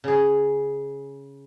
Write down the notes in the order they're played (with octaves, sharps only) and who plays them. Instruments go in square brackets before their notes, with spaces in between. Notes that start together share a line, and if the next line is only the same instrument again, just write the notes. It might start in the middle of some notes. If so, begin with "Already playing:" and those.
[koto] C#3 G#4